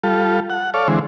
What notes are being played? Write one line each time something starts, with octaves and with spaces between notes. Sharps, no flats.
G3 F4 A4
F#5
A4 C#5 D5 F5
D3 E3 G#3 C4